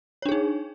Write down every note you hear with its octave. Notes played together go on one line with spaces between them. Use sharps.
D4 D#4 G#4 C#5